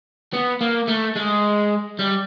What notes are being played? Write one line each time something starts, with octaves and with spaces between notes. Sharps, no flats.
B3
A#3
A3
G#3
G3